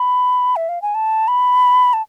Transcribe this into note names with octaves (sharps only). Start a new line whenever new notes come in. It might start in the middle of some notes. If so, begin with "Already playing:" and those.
Already playing: B5
E5
F5
G#5
A5
B5
A5